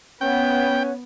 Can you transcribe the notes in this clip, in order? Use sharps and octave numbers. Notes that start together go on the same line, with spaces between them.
B3 C#4 B4 C#5 F#5 G5